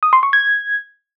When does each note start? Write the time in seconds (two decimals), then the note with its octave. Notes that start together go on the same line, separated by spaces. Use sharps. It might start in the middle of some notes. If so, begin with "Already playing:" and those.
0.03 D#6
0.13 C6
0.23 C#6
0.33 G#6